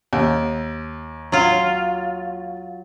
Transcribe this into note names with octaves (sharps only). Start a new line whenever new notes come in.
D#2
F#3 F4